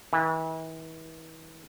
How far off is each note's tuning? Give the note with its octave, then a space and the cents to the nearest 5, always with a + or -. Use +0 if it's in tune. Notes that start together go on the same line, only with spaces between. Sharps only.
E3 -35